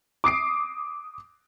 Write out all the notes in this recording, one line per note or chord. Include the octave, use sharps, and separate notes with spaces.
D6 D#6 C7 D7